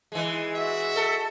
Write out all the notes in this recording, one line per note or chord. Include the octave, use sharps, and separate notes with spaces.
E3 G#3
F#4 E5
A4